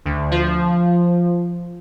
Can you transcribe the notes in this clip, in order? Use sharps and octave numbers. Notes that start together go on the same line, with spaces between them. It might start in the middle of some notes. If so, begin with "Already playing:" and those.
D2
F3